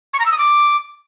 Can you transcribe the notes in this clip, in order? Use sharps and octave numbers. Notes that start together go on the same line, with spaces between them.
C#6
A#5
E6
D#6
D6